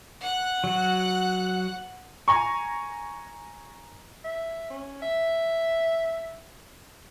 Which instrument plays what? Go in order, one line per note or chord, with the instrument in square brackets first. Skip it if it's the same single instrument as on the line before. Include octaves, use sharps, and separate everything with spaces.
[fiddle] F#5 F#6
[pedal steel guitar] F#3 F#4
[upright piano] G#5 A#5 C#6
[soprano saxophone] E5
C#4
E5